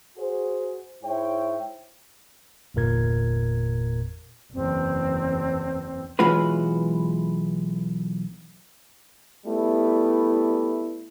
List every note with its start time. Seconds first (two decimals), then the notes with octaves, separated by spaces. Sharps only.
0.17 F#4 G#4 C5
1.04 G#2 E4 C5 C#5 E5 G5
2.74 G1 E2 A#2 A#4 G#6
4.53 F#1 E2 C4
6.19 B1 E3 G#3 F4 F#4 B4
9.46 G3 A3 B3 E4